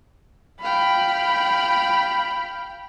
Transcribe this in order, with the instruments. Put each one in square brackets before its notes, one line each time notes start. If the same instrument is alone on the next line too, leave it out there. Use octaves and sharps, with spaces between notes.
[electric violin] F5 G5 [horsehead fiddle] B5